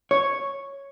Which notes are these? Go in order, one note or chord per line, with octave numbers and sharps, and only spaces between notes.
C#5